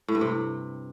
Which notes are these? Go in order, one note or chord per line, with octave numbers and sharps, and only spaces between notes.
A2
G2
C3